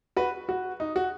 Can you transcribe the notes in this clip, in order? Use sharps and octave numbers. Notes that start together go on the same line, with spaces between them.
F#4 B4
F#4
D#4
F#4